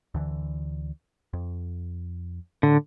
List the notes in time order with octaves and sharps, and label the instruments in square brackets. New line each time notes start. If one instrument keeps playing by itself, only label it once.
[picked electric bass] D2 D3 E3
F2
[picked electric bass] A2 [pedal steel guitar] D3